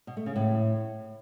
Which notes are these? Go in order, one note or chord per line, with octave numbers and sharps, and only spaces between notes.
B2
A3
C#3
A2